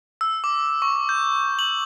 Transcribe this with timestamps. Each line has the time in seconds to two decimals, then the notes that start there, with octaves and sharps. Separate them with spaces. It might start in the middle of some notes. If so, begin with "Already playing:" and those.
0.21 E6
0.44 D6
0.82 C#6
1.09 G6
1.59 F#7